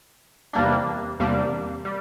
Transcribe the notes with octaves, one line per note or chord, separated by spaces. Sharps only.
E2 C3 G3 A#3 D4
E2 C3 G3 A#3 D4
G3